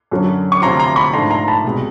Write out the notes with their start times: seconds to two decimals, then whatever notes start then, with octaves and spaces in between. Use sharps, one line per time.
0.11 F#2 D3 F#3
0.52 C#6
0.62 D2 C3 F3 A#5 C6
0.80 A#5 C6
0.96 B5 C#6
1.13 G#2 F3 A3 D4 A#5 C6
1.31 A#5 C6
1.48 A5 B5
1.65 C2 B2 G#3